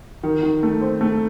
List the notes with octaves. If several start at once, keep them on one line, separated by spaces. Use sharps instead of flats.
D#3
D#3
A3
C4
A3